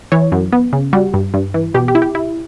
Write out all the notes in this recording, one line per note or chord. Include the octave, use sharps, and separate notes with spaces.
E3 C#5
F#2
B3
C#3
G3 F#4
G2
G2
E3
B2 G4
G4
E4
G4
E4